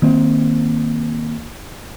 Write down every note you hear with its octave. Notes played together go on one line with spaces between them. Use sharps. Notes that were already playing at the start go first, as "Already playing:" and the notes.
D#3 A#3 C4